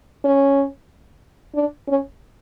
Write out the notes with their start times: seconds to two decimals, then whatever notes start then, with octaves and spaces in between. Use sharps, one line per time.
0.24 C#4
1.55 D4
1.88 C#4